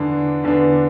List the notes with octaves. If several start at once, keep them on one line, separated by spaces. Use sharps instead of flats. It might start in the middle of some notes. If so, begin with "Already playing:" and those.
Already playing: E2 D3 B3 D4
E2 D3 B3 D4